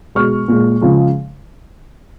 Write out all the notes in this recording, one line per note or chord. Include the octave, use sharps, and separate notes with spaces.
B2 G#3 C#6 F6
A#2 G#3
C#3 F3 G#3